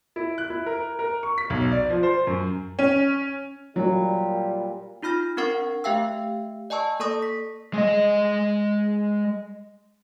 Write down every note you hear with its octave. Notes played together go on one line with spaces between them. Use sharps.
E4
F#6
E4
A#4
A#4
C#6
B6
B1
D5
F3
C5
F#2
C#4
A#2 F#3 G3
D#4 F4 B5 F6 A#6
C4 D4 A#4 F#5 C#6 C7
A3 G4 E5 F5 G5 E6
D5 D#5 G#5 A5 C#6 E6
A#3 A4 D5 C#6 D#6 A#6
B6
G#3 D#5